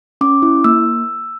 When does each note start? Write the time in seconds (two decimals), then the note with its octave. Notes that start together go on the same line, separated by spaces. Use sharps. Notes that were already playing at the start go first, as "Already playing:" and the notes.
0.21 C#4 D6
0.42 E4
0.64 A#3 E6